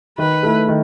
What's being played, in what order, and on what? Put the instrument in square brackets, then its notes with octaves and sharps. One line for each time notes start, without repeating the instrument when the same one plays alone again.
[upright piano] D#3 [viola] B4
[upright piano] A3 E4
D#3